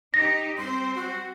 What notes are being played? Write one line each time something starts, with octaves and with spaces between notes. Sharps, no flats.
D#4 G4 A#6
G3 C4 C5 C6
F#4